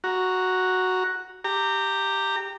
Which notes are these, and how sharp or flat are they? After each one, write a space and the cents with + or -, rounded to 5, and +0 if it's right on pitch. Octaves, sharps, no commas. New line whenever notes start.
F#4 +0 A#5 +5
G4 +0 A#5 -20